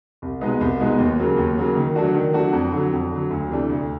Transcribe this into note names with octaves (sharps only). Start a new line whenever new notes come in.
C2
B2 G#3 B3 D#4
C2
B2 G#3 B3 D#4
D#2
C#3 F#3 A#3
D#2
C#3 F#3 A#3
D#3
F#3 A3 D4 F#4
D#3
F#3 A3 D4 F#4
F2
D3 F#3
F2
D3 F#3
D2
C3 E3 A3 D4
D2